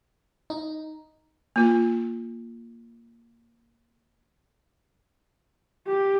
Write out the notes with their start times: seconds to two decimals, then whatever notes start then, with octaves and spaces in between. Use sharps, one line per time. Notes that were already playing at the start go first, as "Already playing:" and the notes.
0.50 D#4
1.56 A#3 F4
5.87 G4